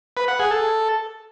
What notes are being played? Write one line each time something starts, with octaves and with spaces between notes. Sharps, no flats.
B4
F#5
G#4
A4